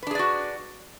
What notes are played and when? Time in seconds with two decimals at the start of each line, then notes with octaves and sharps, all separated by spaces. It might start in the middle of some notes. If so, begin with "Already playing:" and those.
0.03 B4
0.07 D4
0.11 G#4
0.15 D5
0.19 F#4